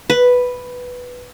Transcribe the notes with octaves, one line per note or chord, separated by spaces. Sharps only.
B4